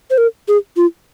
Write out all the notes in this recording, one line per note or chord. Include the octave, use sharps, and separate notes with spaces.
C5
A#4
G#4
F4